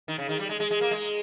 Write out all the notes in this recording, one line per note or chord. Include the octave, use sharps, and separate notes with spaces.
D#3
C#3
D#3
G3
G#3
G#3
G#3
A#3
G#3